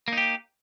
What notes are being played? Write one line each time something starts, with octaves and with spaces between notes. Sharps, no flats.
A#3 D#4 G4